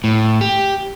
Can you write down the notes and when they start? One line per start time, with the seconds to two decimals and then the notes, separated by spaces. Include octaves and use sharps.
0.04 A2
0.41 G4